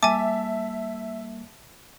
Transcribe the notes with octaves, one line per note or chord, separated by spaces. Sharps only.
G3 A#3 E5 G#5 A5 D6